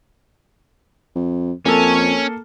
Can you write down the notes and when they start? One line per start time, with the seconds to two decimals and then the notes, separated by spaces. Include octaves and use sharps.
1.16 F2
1.65 F2 A#3 C#4 A4